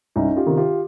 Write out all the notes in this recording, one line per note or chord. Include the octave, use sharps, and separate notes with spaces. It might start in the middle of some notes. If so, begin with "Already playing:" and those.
C2 C#4 D#4
F4 G4
C3 D#3
F4 G4